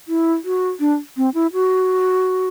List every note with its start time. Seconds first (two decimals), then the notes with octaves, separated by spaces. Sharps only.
0.08 E4
0.44 F#4
0.80 D4
1.17 C4
1.34 E4
1.53 F#4